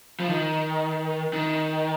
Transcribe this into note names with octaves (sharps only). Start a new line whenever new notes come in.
F3
D#3
D#3